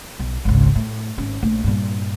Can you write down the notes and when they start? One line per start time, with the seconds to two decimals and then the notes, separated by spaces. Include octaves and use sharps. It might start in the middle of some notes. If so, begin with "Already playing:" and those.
0.19 B1
0.45 G#1 C#2
0.76 A2
1.18 G#1 C#4
1.42 A#1 A3
1.64 G2 A#2